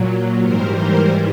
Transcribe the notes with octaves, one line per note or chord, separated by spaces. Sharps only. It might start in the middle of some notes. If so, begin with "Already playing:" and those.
Already playing: A#2 F#3
G#2 E3 G3 A#4 C5
A#4 C5